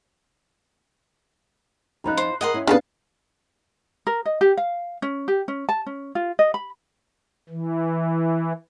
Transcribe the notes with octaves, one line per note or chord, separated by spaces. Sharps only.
F2 F3 D#4 A#5 B5 F#6
C5
G#4 A#4 D#5 F#5 C6
C#4 E4
C#3 F3 B3 D4 B4 F5 A5
A#4
D#5
G4
F5
C#4
G4
C#4
A5
C#4
F4
D#5
B5
E3